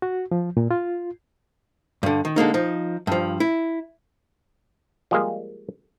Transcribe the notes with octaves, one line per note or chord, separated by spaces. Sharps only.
F#4
F3
A#2
F4
G2 D3
D#3
D3 G#3 A#3 D#4
F3 D#4
G2 F3
E4
F3 G3 G#3 A#3 G#4 C5